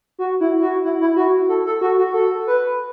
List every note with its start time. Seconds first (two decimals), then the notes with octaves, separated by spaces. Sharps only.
0.19 F#4
0.41 E4
0.62 F#4
0.84 E4
1.01 E4
1.16 F#4
1.49 A4
1.66 A4
1.81 F#4
1.98 F#4
2.14 A4
2.47 B4